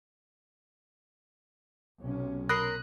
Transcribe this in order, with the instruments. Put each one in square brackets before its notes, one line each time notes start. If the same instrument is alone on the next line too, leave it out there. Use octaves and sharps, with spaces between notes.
[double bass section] B1 C3 C#4
[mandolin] A#4 C6 [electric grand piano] B5 D#6 A#6 [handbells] F#6